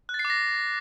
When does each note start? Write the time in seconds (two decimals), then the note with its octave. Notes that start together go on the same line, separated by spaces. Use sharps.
0.09 F#6
0.14 A6
0.19 C7
0.25 D6
0.30 A#6